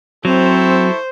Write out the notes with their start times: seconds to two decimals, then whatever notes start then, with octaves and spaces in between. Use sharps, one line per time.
0.25 F#3 C4 E4 A4 C5 C#6